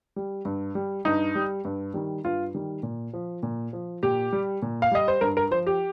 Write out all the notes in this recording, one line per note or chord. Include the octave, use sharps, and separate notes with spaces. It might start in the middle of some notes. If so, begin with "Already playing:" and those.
G3
G2
G3
G2 D#4
G3
G2
D#3 G3
G2 F4
D#3 G3
A#2
F3
A#2
F3
A#2 G4
G3
A#2
F5
G3 D#5
C5
G2 A#4
A#4
F3 C5
G4